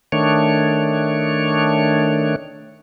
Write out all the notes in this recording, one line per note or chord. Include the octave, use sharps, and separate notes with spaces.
D#3 A3 D4 C#5